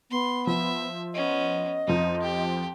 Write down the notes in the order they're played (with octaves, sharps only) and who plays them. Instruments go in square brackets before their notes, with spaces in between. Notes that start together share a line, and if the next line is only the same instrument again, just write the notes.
[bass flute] B3 [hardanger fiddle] C6
[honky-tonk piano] F3 [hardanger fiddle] E5
[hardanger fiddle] B3 C#4 [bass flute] D#5
[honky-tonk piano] F2 F3 [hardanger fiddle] D#4
[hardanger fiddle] G4